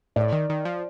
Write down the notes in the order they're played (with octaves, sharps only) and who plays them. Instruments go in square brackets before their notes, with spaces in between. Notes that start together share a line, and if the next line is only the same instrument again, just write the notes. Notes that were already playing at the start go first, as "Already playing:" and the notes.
[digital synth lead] A2 [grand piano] D5
[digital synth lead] D#3
D#3
F3